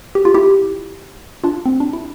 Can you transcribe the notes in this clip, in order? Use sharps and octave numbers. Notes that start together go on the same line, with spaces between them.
G4
F4
E4 G4
D4 F4
C4
D4
E4